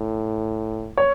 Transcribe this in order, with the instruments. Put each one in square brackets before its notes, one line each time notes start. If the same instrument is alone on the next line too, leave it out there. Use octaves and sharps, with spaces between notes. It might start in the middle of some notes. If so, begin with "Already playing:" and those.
Already playing: [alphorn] A2
[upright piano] C#5